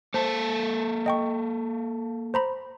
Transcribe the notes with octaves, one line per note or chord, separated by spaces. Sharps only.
A#3 A4 C5 A5
D#5 G5 C#6
C5 A#5 B5